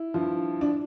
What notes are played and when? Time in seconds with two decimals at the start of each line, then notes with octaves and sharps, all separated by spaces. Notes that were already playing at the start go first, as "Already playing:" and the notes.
Already playing: E4
0.14 G2 F3
0.61 D4